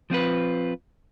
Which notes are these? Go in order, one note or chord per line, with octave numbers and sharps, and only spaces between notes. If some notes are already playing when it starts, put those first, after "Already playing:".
F3 C4 F4 B4